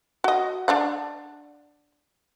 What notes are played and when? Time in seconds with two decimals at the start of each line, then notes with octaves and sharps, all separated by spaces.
0.24 F#4 D#5
0.68 D4 D5 F#5